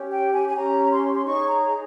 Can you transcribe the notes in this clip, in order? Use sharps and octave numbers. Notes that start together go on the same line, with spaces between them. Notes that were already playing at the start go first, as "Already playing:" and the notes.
Already playing: C#4 G4 C#5
G5
G#5
G#5
C#4 G4 C#5 A#5
C6
C6
D#4 G#4 C#5 C#6
A#5